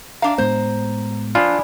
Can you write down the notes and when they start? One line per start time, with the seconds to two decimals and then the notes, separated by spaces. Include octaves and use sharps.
0.22 D4 F5 A#5
0.38 A2 G#3 B3 C5
1.35 F3 D4 F4 D5 G#5 B5